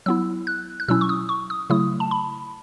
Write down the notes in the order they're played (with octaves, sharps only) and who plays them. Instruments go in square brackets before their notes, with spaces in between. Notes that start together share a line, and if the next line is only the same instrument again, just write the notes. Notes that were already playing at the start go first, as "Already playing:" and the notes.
[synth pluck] F#3 B3 E4 E6
F#6
F#6
B2 F#3 C#4 E4 E6
C#6
D#6
C#6
D#6
C#3 F#3 A3 E4 D#6
A5
B5